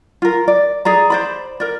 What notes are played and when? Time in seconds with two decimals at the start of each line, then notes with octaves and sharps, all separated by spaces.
0.22 F4 A#4
0.48 D5
0.85 G#4 D5 A#5
1.10 C5 D5 B5
1.60 A#4 D5